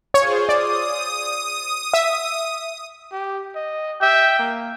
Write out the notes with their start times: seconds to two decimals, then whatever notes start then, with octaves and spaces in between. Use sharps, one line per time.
0.14 F4 G#4 C5 C#5
0.49 D5 D#6
1.94 E5
3.12 G4
3.55 D#5
4.02 E5 G5
4.39 A#3